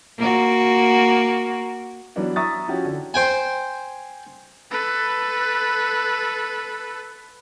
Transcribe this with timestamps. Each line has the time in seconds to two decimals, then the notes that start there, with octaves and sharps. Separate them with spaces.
0.19 A#3 F#4
2.16 E3 F#3 G3 B3 D4 F#4
2.36 E5 A#5 C#6 D#6 A6
2.68 F3 C#4 E4 F#4 G4
2.85 D3
3.14 C5 G5 G#5
4.71 A4 B4